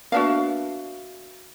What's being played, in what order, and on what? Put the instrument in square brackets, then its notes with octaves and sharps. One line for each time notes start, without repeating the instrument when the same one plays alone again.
[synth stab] A#3 B3 D4 [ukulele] F#4 E5 F5